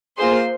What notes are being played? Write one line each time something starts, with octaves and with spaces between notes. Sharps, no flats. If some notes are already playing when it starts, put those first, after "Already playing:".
A#3 F4 G#4 C5 C6